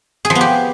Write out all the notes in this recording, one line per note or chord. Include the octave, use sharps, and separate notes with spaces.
G#4
F3
B3
G4